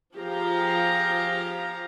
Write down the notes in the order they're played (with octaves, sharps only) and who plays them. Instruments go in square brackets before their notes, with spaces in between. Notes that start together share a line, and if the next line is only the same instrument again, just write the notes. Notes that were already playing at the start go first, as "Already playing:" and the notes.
[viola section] F3 G4 G#4 F5 A#5